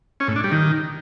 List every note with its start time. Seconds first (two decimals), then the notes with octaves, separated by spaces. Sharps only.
0.20 C#4
0.28 A2
0.36 D4
0.44 G3
0.52 D#3